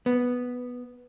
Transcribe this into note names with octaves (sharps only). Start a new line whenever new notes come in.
B3